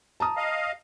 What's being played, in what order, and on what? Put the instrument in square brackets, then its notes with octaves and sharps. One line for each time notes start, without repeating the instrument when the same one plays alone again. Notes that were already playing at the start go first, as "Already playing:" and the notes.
[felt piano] A5 A#5 D#6
[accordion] D#5 F5